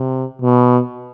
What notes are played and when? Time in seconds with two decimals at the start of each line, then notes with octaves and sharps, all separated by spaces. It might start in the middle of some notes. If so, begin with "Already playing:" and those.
Already playing: C3
0.42 B2